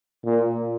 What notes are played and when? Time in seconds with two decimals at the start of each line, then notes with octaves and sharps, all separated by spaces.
0.25 A#2